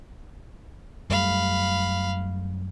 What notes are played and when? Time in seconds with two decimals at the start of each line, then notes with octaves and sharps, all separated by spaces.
1.10 F#2 G3 A3 F5 B5